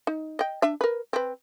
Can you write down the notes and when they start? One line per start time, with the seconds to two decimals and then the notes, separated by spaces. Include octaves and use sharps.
0.07 D#4
0.39 D#5 G5
0.62 D4 E5
0.81 A#4 B4
1.13 C4 B4